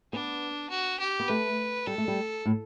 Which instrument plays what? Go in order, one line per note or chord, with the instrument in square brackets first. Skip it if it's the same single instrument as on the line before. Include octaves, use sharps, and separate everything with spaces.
[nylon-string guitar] B3 [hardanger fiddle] D4
[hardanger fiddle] F#4
G4
[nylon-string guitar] B3
[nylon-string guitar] A3 [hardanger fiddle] B4
[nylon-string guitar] G3 [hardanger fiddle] A4
[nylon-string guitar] A3
G3
A2